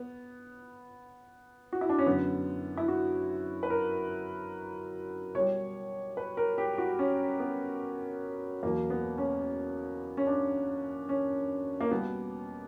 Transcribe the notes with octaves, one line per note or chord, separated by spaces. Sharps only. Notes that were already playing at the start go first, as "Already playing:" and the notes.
Already playing: B3
F#4
E4
D4
C#4
F#2 D3 F#3 B3
E4
F#4
B4
A#4
B2 G3 C#5
B4
A#4
G4
F#4
C#4
B3
E2 B2 F#3 A#3
B3
C#4
C#4
D4
C#4
A#3
B2 G3 B3